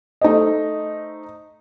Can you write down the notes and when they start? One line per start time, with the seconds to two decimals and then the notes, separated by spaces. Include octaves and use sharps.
0.21 A3 D#4 C5 D#5